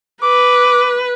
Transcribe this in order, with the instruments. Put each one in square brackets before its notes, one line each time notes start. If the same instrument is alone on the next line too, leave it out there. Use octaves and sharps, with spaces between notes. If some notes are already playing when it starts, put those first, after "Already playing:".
[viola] B4 [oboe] D6